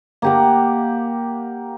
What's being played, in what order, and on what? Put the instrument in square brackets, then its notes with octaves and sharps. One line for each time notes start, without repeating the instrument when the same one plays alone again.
[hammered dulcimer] A#3 G4 F#5